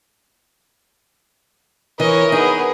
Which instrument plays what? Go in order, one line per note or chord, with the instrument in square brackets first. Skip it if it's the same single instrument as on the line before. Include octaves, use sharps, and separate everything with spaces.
[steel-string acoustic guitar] E3 [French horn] A#4 [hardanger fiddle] C#5 D#5
[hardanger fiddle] B3 G#4 [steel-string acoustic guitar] D#4